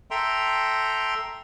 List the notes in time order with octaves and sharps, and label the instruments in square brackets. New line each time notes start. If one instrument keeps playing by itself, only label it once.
[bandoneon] A4 E5 G5 A#5 C6